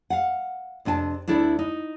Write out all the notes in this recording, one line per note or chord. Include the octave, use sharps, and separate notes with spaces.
F5 F#5
F2 C3 D4 G#5 A5
D2 D4 E4 A4 D5
D#4